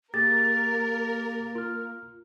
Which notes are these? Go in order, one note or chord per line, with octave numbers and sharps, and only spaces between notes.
A#3 G4 G#4 A#4 A6
F4 F6